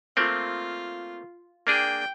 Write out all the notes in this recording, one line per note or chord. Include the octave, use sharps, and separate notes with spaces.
A3 A#3 C4 F4
A#3 D4 G#4 G5